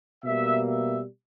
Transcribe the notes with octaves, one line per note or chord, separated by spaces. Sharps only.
B2 G3 A#3 E5
E5